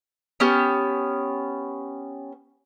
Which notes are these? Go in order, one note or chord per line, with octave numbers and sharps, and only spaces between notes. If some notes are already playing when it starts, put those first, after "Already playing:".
B3 C#4 G4